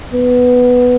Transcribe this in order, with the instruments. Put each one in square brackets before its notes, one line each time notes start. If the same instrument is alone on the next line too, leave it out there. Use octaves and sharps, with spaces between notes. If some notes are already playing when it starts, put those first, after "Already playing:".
[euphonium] B3